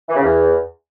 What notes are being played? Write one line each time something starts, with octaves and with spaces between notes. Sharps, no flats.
E3
C#3
E2